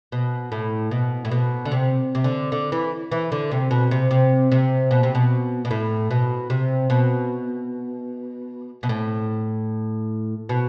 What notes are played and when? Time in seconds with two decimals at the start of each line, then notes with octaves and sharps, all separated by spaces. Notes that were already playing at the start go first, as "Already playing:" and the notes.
0.12 B2
0.52 A2
0.91 B2
1.25 A2
1.31 B2
1.65 D3
1.72 C3
2.15 C3
2.24 D3
2.52 D3
2.72 E3
3.11 E3
3.32 D3
3.52 C3
3.71 B2
3.91 C3
4.11 C3
4.52 C3
4.91 B2
5.03 C3
5.15 B2
5.65 B2
5.71 A2
6.11 B2
6.50 C3
6.90 B2
8.83 B2
8.89 A2
10.49 B2